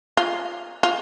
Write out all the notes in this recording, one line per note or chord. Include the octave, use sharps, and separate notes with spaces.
F4
F4